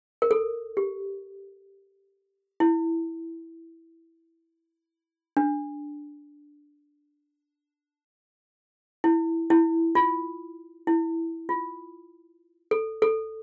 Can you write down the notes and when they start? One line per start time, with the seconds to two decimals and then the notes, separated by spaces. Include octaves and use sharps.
0.22 A#4
0.31 A4
0.77 G4
2.60 E4
5.37 D4
9.04 E4
9.50 E4
9.95 F4
10.87 E4
11.49 F4
12.71 A4
13.02 A4